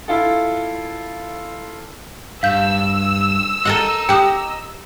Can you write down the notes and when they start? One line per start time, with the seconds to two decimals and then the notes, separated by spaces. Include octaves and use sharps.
0.08 E4 F4 A4
2.43 G2 F5 E6 G6
3.65 A4 A#4 D#5 F#5 A#5
4.09 G4 F#5 G5 D#6